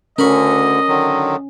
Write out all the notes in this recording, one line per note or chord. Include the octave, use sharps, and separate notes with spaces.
D2 D3 C#4 A#4 D#5 B5 C#6
D3 D#3 F#3